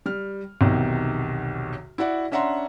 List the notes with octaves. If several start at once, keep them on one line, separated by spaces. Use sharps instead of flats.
G3 F6
B1 E2 C3 D#3
E4 F#4 D5 F#5
C#4 D4 E5 F#5 A#5 C6